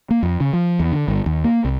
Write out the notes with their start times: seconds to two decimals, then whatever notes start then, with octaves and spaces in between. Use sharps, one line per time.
0.10 A#3
0.23 F2
0.41 C#3
0.53 F3
0.80 E2
0.92 D3
1.08 G1
1.26 D#2
1.44 A#3
1.65 C2